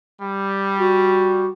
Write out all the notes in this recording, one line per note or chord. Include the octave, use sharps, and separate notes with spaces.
G3
F#4